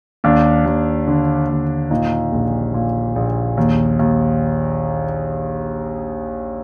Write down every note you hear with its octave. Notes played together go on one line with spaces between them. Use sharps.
D#2 D4
D#2
D3
D#2
A#2 D#4
A#1
A#2
A#1
D#2
D#2